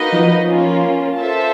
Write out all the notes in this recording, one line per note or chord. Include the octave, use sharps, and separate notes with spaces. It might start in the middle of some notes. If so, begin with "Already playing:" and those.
Already playing: A#3 D#4 F#4 B4 D#5
F3
A#3 C#4 F4
F4 A4 C5 E5 A5